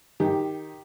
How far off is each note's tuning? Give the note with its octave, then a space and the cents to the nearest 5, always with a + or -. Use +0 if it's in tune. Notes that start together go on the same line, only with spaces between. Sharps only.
D#3 +0 G4 +10